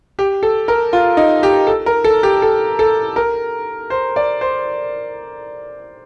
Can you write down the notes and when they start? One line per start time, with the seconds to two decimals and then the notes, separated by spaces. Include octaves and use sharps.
0.19 G4
0.43 A4
0.68 A#4
0.93 F4
1.17 D#4
1.43 G4
1.67 A4
1.86 A#4
2.04 A4
2.23 G4
2.42 A4
2.79 A4
3.16 A#4
3.90 C5
4.16 D5
4.41 C5